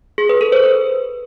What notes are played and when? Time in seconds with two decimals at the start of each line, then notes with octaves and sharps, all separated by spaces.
0.18 G#4
0.29 B4
0.41 A4
0.52 C5
0.64 B4